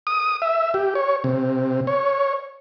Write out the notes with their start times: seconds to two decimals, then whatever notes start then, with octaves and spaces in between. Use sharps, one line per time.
0.07 D#6
0.42 E5
0.74 G4
0.95 C#5
1.24 C3
1.87 C#5